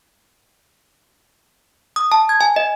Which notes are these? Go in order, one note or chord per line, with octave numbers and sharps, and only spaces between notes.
D#6
A5
G#6
G#5
D#5